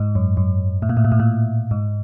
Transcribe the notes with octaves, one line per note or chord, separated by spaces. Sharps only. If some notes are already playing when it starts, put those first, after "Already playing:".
Already playing: G#2
F#2
F#2
A2
A#2
A2
A#2
A2
A#2
G#2